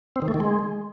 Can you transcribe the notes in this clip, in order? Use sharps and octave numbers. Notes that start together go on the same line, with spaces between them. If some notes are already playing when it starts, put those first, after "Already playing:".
C4
D#3
A3
D#3
G#3